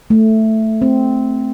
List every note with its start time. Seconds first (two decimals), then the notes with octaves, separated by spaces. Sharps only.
0.10 A3
0.82 C4